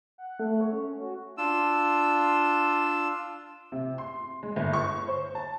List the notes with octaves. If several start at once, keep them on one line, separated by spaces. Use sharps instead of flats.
F#5
A3
C#5
C#4
F#4
D4 F4 E6
C3
C6
G#3
G1
C#6
C5
A5